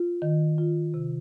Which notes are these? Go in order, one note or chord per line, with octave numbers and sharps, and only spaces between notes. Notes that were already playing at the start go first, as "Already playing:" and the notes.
Already playing: F4
D#3
F4
C3